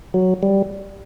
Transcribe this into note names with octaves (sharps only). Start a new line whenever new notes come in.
F#3
G3